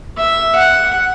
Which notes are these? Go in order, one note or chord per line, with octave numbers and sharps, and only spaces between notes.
E5
F#5